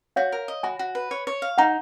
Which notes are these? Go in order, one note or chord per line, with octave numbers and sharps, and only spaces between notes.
F#4 C#5 F5
A#4
D#5
F#4 G#5 B5
F#4
B4
C#5
C#5
F5
D#4 F#5 A#5